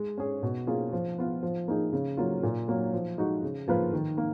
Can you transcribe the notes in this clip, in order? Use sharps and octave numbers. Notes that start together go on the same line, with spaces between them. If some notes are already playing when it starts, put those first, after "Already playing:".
Already playing: G#3
C#4 G#4
B2
A#3 C#4 F4 G#4
F3
B3 F4
F3
A#3 D#4 G#4
C#3
F#3 A#3 F4
A#2
F#3 A#3
F3
G#3 D#4 F#4
C#3
F3 A#3 F4 B4
D#3
A#3